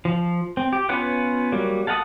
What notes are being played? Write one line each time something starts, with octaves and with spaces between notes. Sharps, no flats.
F3
C4
G4
B3 C#4 F4 B4 F#5
F#3 G3 A#3
A4 F5 F#5 A5 D#6